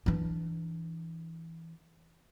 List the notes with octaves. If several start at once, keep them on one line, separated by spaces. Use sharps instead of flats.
E3 D4